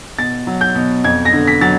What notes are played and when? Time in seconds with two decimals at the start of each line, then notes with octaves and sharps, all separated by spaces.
0.18 B2 A6
0.47 F#3
0.61 G6
0.75 B2
1.04 F2 G#6
1.25 A#6
1.33 D3
1.48 B6
1.61 F#3 A6